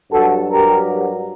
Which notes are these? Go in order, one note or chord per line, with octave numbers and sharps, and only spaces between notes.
G2 F#3 F#4 A4
G4 A#4